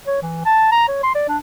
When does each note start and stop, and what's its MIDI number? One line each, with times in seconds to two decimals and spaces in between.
0.07 0.21 73
0.22 0.45 52
0.45 0.69 81
0.72 0.88 82
0.88 0.99 73
1.03 1.13 84
1.15 1.24 74
1.28 1.37 62